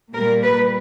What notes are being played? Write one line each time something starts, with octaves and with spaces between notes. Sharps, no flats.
A#2 G3 A#3 A#4
B4